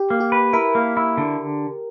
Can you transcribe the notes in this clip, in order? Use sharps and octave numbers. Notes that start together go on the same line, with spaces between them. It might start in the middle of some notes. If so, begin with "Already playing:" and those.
Already playing: G4
A#3
G4
B4
E4 A#4
A#3
E4
D3